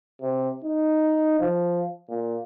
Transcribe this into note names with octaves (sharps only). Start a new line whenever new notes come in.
C3
D#4
F3
A#2